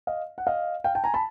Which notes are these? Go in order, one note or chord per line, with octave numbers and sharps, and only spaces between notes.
D#5 F5
F#5
D#5 F5
F5 G5
G5 A5
G#5 A#5
A5 B5